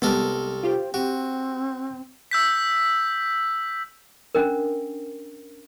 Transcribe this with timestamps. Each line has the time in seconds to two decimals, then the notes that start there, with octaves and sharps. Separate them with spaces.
0.02 C2 G3 G#3 B3 A4 A#4
0.63 F4 G4 C5
0.94 C4 F#4 G4
2.31 E6 G6 B6
4.35 C#4 D4 A#4